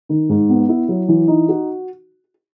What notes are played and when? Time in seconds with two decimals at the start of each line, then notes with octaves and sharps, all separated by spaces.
0.09 D#3
0.29 G#2
0.49 B3
0.69 E4
0.89 F#3
1.08 E3
1.28 D#4
1.49 F#4